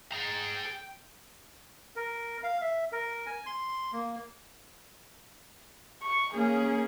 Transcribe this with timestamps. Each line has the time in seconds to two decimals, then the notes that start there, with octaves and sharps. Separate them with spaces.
0.12 G#4 G5 A#5
1.96 A#4
2.43 F5
2.61 E5
2.92 A#4
3.26 G#5
3.46 C6
3.93 A#3
6.02 C#6
6.34 A#3 C#4 G#4